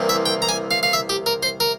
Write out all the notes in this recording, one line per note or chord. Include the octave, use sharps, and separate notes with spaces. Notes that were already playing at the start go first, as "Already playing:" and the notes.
Already playing: C2 C3 E3 A#3
E5
G5
A#5
G#5
F5
F5
E5
G4
A#4
C5
A#4